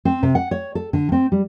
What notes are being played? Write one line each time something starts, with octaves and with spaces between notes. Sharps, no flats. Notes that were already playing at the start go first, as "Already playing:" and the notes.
C4
C3
F#5
C#5
A4
D3
C4
G3